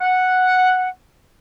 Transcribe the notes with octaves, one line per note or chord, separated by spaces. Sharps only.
F#5